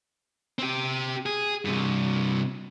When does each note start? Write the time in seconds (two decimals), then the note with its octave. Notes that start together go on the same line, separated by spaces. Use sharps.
0.59 C4 G4
1.26 G#4
1.65 G2 C3